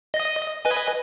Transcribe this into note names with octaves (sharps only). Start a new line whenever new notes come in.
D#5 A#6
B4 D#5 G#5